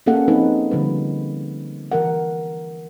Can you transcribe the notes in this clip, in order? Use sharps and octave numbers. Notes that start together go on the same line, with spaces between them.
A#3 C#4 G#4 A4 F5 F#5
F3 C4 D#4 B4
D3 F3 G3 B4
E3 A#4 F#5